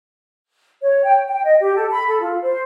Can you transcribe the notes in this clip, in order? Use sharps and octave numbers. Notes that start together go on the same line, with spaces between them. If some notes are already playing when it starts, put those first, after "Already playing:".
C#5
G5
G5
D#5
G4
A4
B5
A4
F4
C5